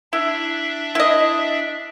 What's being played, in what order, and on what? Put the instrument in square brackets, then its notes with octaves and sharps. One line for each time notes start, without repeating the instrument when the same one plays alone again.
[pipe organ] D4 E5 [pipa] E4
[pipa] E4 D#5